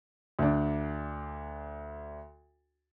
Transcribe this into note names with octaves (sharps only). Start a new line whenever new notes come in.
D2 D4